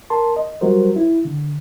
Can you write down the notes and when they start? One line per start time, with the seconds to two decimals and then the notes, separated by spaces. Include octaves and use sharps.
0.10 A#4 A5 C6
0.36 D#5
0.61 F#3 G3 F#4 A#4 C5
0.96 E4
1.25 D3